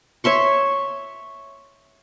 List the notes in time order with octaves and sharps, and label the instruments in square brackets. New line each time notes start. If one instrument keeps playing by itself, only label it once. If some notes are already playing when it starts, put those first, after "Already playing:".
[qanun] C#5 E5 C6 C#6